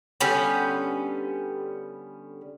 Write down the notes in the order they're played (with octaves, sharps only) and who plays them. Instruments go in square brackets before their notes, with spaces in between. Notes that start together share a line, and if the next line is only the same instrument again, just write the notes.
[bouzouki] D3 G3 B3 C#4